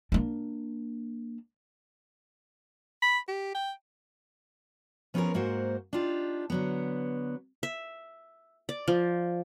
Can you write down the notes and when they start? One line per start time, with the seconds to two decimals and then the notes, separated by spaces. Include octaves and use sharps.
0.12 A#3 D4
3.02 B5
3.28 G4
3.55 G5
5.14 F3 B3 C#4 F#4 G#4 A#4
5.34 G#2 A#3 F#4 C5 F#5
5.93 D4 D#4 F4 G4
6.50 D3 F#3 B3
7.63 E5
8.69 D5
8.88 F3